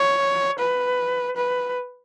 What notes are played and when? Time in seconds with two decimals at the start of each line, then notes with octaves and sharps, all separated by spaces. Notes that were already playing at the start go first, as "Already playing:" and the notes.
Already playing: C#5
0.59 B4
1.37 B4